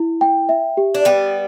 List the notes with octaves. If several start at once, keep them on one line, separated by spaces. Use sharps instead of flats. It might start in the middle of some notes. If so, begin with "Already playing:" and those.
Already playing: E4
G5
E5
G4
D4
G3 B3 G5